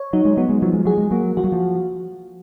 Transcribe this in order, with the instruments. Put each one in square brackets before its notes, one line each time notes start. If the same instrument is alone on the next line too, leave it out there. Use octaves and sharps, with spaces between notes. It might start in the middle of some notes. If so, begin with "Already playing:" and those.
Already playing: [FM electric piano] C#5
[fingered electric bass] F#3 [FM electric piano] D#4
[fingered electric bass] G#3
[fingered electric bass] F#3 [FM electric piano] B3
[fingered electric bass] G#3
[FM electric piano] F3 [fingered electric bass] F#3
[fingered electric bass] G#3
[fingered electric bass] F#3 [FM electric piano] G#4
[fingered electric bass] G#3
[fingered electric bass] F#3 [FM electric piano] A#3
[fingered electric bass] F3 [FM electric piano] F#4
[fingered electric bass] F#3
F3